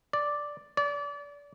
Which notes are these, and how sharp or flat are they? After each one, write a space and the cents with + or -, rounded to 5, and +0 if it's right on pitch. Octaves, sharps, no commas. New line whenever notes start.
D5 +0
D5 -30